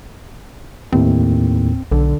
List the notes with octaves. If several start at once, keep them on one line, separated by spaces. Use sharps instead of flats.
D#2 A2 C4
B1 D3